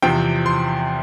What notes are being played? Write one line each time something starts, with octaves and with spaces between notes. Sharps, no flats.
E2 C3 F3 C4 G5
C6